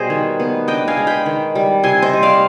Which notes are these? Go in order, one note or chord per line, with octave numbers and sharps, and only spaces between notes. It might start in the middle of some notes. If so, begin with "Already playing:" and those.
Already playing: B2 G3 G#4 C5 D#5
D#3
B3
D4 D#5 G5
F5 G#5
G#3
G5 B5
D#3
G3
C3 G#5 C6
C5 D#5
G3
D5 F5